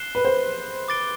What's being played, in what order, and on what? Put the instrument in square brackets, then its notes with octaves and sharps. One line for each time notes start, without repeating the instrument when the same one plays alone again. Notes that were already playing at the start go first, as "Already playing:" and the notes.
Already playing: [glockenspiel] F#6 C7 E7 G7
[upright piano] B4
C5
[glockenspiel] D6 A6 D7 G7